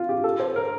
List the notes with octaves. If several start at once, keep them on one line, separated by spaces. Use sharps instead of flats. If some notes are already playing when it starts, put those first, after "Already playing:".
Already playing: F4
G4
A4
C5
A#4